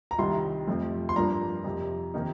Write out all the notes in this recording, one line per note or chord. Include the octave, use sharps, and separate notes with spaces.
A#5
C2 C3 D#3 G3 C6
F2 C3 F3 A3 C4
C6
G2 F3 A#3 D4 A#5
F2 C3 F3
C3 D#3 A#3 D#4